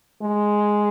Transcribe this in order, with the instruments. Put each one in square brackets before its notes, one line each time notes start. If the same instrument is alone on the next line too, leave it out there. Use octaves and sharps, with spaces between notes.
[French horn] G#3